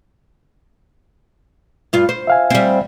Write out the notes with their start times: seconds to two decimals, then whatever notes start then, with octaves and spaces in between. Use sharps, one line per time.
1.93 G2 F4
2.09 C5
2.27 E5 F5 G#5
2.50 G3 C4